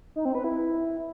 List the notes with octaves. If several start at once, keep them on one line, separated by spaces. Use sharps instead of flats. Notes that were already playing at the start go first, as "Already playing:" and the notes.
D#4
C4
B4
E4